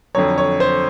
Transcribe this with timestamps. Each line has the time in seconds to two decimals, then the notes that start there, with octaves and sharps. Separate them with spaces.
0.15 F2 D3 F#3 C#5
0.38 C#5
0.60 C5